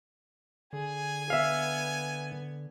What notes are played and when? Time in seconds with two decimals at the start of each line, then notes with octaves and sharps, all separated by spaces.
0.73 D3 G#4 G#5
1.30 B3 E5 F5